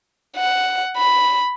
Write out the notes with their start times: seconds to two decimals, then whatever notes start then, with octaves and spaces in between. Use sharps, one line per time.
0.37 F#5
0.97 B5